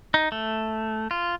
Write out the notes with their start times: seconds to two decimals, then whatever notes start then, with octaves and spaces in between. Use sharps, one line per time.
0.14 D#4
0.32 A3
1.11 F4